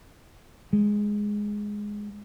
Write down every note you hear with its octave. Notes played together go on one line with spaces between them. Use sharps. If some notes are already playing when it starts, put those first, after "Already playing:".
G#3